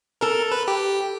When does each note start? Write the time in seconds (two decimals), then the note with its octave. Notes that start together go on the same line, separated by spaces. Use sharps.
0.21 A4 A#4
0.52 B4
0.68 G4